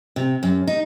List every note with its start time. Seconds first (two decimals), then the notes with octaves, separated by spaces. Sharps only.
0.16 C3
0.43 F#2
0.67 D#4